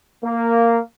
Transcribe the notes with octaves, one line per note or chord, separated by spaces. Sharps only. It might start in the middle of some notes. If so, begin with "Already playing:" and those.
A#3